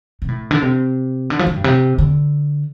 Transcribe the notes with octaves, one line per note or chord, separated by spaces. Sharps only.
C3
A2
D3
C3
D3
F3
D3
G2
C3
D3